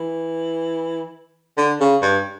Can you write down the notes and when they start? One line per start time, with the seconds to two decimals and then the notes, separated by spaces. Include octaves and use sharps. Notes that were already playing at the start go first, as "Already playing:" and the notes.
Already playing: E3
1.58 D3
1.80 C#3
2.03 G2